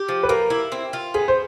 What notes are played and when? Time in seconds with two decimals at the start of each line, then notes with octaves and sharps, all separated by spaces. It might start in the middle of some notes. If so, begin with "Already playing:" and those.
Already playing: G4
0.09 F3
0.23 B4
0.29 A#3 A#4
0.50 E4
0.72 C4
0.93 F4
1.14 B3 G#4
1.28 C5